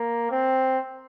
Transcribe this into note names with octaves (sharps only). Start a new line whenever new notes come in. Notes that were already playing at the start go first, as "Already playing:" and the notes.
Already playing: A#3
C4